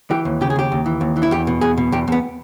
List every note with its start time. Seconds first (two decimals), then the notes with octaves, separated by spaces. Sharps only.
0.11 E3 G4
0.25 D#2
0.41 C#3 G4
0.50 G#4
0.56 D#2 G4
0.72 D#2
0.86 E3
1.01 D#2
1.17 E3
1.23 E4
1.31 E2 G4
1.47 B2
1.61 E2 G#4
1.78 B2
1.92 E2 G4
2.08 E2 B3